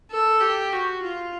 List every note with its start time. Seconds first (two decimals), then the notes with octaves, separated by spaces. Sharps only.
0.11 A4
0.41 G4
0.72 F#4
1.02 F4